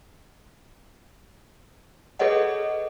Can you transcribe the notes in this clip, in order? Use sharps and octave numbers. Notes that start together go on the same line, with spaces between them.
G#4 A4 B4 C#5 D#5 F#5